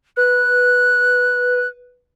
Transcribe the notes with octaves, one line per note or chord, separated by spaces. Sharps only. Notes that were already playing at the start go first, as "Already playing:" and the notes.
B4 F#6